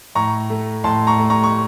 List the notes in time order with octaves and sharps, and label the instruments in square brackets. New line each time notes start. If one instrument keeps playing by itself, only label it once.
[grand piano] A2 A#5 C#6
A3
A2 A5 C6
A#5 C#6
A3
A#5 C#6
C#6